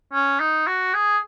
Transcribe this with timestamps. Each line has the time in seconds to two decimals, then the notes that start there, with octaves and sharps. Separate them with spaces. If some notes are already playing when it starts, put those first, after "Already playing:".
0.13 C#4
0.40 D#4
0.67 F#4
0.94 G#4